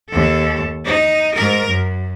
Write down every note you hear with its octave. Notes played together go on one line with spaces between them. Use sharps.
D#2 A4
D#4
G#2 A#4
F#2